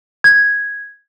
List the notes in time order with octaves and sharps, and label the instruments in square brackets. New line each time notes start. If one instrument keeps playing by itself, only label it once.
[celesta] G#6